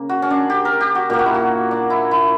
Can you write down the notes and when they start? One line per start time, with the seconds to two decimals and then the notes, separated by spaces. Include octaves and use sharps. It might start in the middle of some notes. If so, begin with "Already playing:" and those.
Already playing: C#3 A#3
0.09 F#4
0.22 C#4
0.31 D4
0.50 G4
0.65 A#4
0.81 G4
0.95 F#4
1.10 A#2 A#3 G4
1.19 F#4
1.26 E4
1.34 F#4
1.71 D4
1.90 E4
2.11 E4